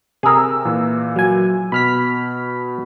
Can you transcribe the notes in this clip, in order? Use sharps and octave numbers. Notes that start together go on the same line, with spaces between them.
C3 G#4 A#4 E6
A#2 E3
F#3 G#5
B2 B5 F6 B6